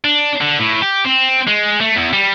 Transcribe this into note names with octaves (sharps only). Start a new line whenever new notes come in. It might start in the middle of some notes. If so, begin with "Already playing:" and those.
D4
D3
A2
G4
C4
G#3
A3
E2
G3